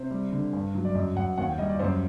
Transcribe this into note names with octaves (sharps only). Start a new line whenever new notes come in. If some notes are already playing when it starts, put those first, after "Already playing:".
Already playing: C3 C5
G3
D3
G2
F#3
D5
F#2 D#5
F#2 F#5
D#2 F#5
G5
G3 D#5
D5
F#2 C5